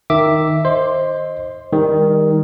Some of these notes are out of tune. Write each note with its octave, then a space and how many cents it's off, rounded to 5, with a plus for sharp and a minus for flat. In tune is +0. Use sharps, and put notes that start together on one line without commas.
D#3 +0 E5 +0 D6 +0
C5 +20 D#5 +0 C6 +0
D#3 +10 G3 +35